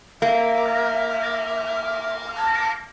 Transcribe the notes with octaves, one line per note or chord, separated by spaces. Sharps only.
A#3 E5
A5